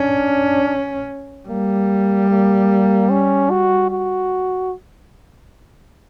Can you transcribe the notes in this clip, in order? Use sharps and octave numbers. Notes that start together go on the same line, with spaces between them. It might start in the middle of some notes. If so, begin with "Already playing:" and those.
Already playing: C#4 D4
G3 A#3
A#3
C#4
F#4
F#4